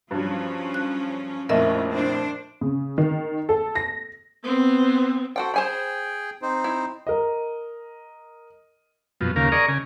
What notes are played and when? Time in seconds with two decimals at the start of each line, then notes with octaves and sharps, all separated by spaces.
0.11 G2 F3 F#3 C#4
0.74 F#6
1.49 A#1 F2 A2 C#4 A#4 D#5 E5
1.93 D4 C5
2.61 C#3
2.98 D#3
3.49 A4
3.75 A#6
4.44 B3 C4
5.36 F#4 A4 C5 F#5 G5
5.54 G#4 C5 G5 G#5 B5
6.42 C4 D#4 C5
6.64 E4
7.07 A#4 D#5
9.21 F#2 B2 F3
9.36 D#2 C#3 A#3 A#4 F5
9.52 G#4 A#4 D5 D#5 A#5 C#6
9.68 C#3 G#5